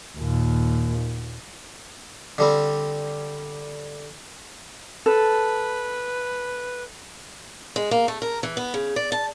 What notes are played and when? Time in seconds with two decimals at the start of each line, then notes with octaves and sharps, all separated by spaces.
0.18 D#2 A#2
2.38 D3 G3 C4
5.06 A4 B4
7.76 G#3
7.91 A#3
8.08 A3
8.22 A#4
8.43 E3
8.57 B3
8.74 C#3
8.96 D5
9.12 A5